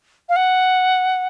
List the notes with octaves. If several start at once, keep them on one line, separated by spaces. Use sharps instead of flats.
F5
F#5